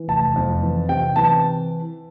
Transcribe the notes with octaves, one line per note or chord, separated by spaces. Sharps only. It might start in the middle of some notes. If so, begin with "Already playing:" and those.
Already playing: E3
F1 A5
F2
E3
C3 G5
E3 A5